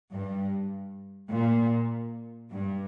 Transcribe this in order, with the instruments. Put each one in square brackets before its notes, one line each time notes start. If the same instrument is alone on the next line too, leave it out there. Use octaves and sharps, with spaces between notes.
[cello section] G2
A#2
G2